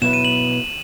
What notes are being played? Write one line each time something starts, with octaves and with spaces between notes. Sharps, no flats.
B2 F#3 B3 E4 B4 E7
D#7
F#7